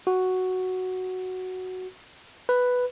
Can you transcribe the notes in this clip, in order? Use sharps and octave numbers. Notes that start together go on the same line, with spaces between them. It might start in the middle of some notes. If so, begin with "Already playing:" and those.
F#4
B4